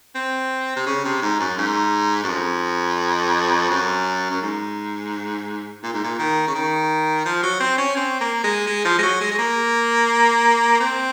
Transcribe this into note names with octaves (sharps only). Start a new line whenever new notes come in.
C4
C3
C#3
C3
G#2
F#2
G#2
F#2
F2
F#2
F#2
G#2
A#2
G#2
A#2
D#3
C#3
D#3
F3
F#3
C4
C#4
C4
A#3
G#3
G#3
F3
G#3
F#3
G#3
G#3
A#3
C4